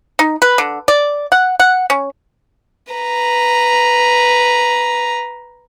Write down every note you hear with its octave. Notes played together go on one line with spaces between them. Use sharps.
D#4
B4
D3
D5
F#5
F#5
C#4
B4 A#5